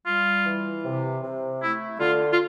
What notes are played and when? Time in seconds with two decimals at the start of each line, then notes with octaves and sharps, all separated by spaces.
0.07 G3 F4
0.46 E3
0.85 C3
1.23 C3
1.62 A3 E4
2.00 D3 F4
2.33 F4